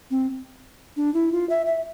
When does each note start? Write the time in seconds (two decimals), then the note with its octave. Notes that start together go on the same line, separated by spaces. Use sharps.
0.11 C4
0.97 D4
1.14 E4
1.32 F4
1.50 E5
1.66 E5